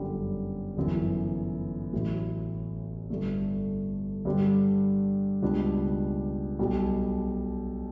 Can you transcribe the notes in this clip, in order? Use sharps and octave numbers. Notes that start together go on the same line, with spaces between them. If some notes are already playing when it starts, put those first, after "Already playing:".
Already playing: G1 F#2 D3 G3
G1 F#2 E3
A1 A2 F#3
G1 G2 D3 A3
G2 D3 G3 D4
C#2 B2 G3 D4
B1 B2 G3